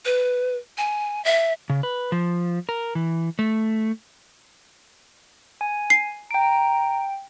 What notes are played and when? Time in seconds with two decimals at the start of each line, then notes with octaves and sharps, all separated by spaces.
0.05 B4
0.78 G#5
1.25 E5
1.70 C#3
1.83 B4
2.12 F3
2.69 A#4
2.95 E3
3.39 A3
5.61 G#5
5.90 C7
6.31 G5 A#5 D7